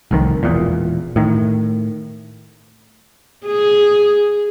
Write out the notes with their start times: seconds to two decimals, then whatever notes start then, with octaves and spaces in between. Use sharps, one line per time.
0.11 F1 C2 F2 D#3
0.43 E1 E2 A#2
1.16 A2 D#3
3.46 G#4